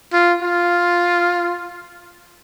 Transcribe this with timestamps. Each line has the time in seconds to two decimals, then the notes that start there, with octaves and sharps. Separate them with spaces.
0.13 F4
0.42 F4